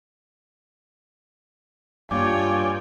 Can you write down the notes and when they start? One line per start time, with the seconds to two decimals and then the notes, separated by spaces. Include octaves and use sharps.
2.11 G2 A#3 F4 C#5 D5 G5 G#5 D6